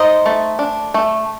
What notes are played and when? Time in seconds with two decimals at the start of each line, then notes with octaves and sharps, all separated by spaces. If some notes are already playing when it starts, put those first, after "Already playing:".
Already playing: D#4 C5 D#5
0.26 A3
0.59 D4
0.94 A3